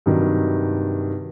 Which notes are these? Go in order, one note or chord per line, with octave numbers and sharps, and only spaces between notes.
G2 C3 D#3 F#3